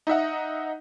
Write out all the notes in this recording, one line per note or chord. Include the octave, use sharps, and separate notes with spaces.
D#4 D#5 E5 F#5